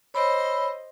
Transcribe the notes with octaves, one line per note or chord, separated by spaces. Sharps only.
C5 C#5 D#5 B5 E6